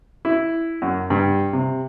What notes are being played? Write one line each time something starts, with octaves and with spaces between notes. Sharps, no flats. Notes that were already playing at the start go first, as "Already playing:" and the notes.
E4
F#2
G2
C3